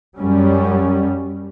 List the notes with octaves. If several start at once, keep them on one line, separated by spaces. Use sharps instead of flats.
F#2 G3 C#4